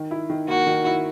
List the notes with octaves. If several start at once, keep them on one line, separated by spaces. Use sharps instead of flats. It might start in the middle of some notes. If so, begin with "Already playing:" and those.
Already playing: D#3
E4
D#3
A#3 F#4
D#3
E4